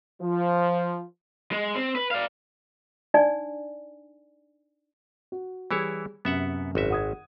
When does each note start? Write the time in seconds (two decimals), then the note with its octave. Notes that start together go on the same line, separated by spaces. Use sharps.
0.21 F3
1.52 G#3
1.75 C4
1.96 B4
2.11 D5 F5
3.14 D4 D#4 D5 G#5
5.32 F#4
5.71 E3 G3 E4 G#4 C#5
6.25 F#2 C3 B3 E5 F#5
6.75 G#1 F#4 E5
6.90 F#5 D#6 G#6